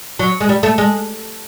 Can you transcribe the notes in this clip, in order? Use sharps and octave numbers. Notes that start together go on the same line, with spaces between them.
F#3
G#3
G3
A3
G#3